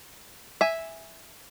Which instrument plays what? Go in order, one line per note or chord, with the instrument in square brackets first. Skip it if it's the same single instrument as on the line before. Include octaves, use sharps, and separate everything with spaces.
[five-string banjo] E5 G#5